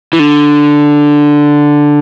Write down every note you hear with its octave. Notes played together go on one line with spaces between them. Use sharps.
E3
D3